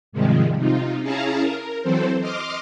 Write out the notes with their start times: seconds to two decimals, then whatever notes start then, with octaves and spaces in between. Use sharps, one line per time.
0.12 G#2 C3 D#3 F3 G3 G#3
0.57 C3 D#4 F4
1.01 C#4 E4 G#4 F5 A5 A#5
1.41 A#4
1.82 E3 F#3 C4 A4 C5
2.21 D#5 C6 D6 F6